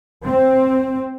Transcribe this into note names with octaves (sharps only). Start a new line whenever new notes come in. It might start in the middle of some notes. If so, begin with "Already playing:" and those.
C4